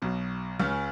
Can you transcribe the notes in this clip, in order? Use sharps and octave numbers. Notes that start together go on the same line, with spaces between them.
B1 B2
C#2 C#3